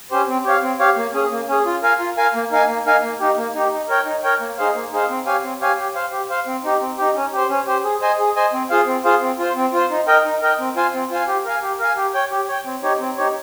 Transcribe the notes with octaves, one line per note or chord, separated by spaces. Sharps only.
C#4 G4 C5
C4
G4 C#5 F5
C4
G4 C#5 F5
A#3
C#4 G#4
A#3
C#4 G#4
F4
A#4 F5 G#5
F4
A#4 F5 G#5
A#3
D#4 A#4 F5 G#5
A#3
D#4 A#4 F5 G#5
A#3
D#4 G4
A#3
D#4 G4
D#4
A#4 C#5 G5
D#4
A#4 C#5 G5
A#3
D#4 G#4 C5 F5
A#3
D#4 G#4 C5 F5
C4
G4 C#5 F5 G#5
C4
G4 C#5 F5 G#5
G4
C5 F5
G4
C5 F5
C4
D#4 G4
C4
D#4 G4
C#4
G4 C5
C#4
G4 C5
G#4
C5 D#5 G#5
G#4
C5 D#5 G#5
C4
F4 G#4 C5 F5
C4
F4 G#4 C5 F5
C4
F4 C5
C4
F4 C5
D#4
A#4 D#5 G5
D#4
A#4 D#5 G5
C4
F4 C5 F5 G#5
C4
F4 C5 F5 G#5
G4
A#4 F5 G#5
G4
A#4 F5 G#5
G4
C#5 G5
G4
C#5 G5
C4
D#4 G4 C#5
C4
D#4 G4 C#5